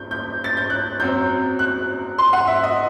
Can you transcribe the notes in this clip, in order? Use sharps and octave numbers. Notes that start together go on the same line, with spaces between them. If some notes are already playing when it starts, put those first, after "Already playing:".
Already playing: G6
G6
A6
G6
F#6
F#2 F#3 C4 G6
F#6
C6
F#5
E5
D#5